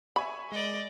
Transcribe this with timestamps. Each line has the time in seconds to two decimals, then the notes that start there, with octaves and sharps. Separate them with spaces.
0.16 E5 G#5 B5 C#6
0.52 G#3 D5 D#5